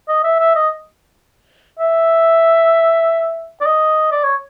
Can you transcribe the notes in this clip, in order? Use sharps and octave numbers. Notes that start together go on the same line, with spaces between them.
D#5
E5
E5
D#5
E5
D5
D#5
D5
C#5